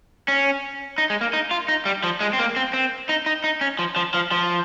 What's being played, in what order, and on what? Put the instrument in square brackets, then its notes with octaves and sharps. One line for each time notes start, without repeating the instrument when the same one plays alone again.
[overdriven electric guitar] C#4
D#4
G#3
A#3
D#4
F4
D#4
G3
F3
G#3
C4
A#3
C4
C4
D#4
D#4
D#4
C#4
F3
F3
F3
F3